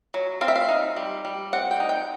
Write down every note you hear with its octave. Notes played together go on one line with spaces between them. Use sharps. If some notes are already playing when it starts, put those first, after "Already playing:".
F#3
C4 F5
E5
F5
D#4
G3
G3
C4 F#5
G5
D#4
G5